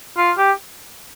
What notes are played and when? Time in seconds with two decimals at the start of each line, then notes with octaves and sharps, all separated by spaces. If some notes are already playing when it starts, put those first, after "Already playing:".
0.17 F4
0.37 G4